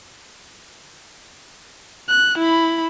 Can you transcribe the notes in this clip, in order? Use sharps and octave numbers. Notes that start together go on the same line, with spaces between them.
F#6
E4 B5